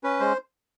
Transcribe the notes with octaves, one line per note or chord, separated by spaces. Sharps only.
C#4 B4
G#3 C5